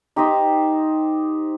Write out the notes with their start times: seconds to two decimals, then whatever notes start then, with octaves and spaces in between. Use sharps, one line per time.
0.16 D#4 G4 C5 D#5